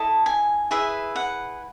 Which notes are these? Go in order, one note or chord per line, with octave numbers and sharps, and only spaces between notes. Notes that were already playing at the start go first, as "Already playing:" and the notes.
Already playing: E4 A4 D#5 A5
G#5
E4 G#4 B4 E5
F#5